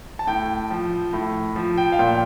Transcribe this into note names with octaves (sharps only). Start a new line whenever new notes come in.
A5
A2 G5
F3
A2
F3
G5
F5
A#2 G5